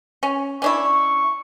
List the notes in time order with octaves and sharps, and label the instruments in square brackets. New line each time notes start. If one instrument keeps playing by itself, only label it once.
[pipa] C#4
[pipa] C#4 D4 E4 [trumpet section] C#6